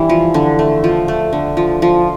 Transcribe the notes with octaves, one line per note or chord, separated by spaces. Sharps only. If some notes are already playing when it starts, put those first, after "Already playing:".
Already playing: E3 G3 D4
F3
D3
A3
F3
A3
D3
F3
F3